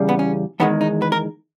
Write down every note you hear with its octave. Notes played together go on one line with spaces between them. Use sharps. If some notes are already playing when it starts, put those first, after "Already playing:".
Already playing: E2 C#3 G3
B3
C#4
E2 D#3 G#3 B3
D#4
B4
A#4